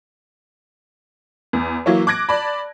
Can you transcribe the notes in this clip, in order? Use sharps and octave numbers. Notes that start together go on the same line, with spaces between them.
E2
E3 F#3 A#3 E4 C#5
D6 F#6 G#6 A#6 D7
D5 A5 B5